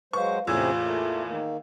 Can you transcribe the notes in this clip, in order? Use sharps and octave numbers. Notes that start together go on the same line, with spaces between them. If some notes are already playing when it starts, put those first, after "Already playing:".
F#3 G#3 B4 C5 F5 C#6
E2 A2 C3 C#4 F4 G#4 E6 G#6
A3 A#3
D#3 A#3